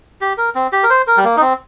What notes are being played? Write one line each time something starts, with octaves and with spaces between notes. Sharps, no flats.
G4
A#4
C4
G4
A#4
C5
A#4
G3
A#3
D#4
C4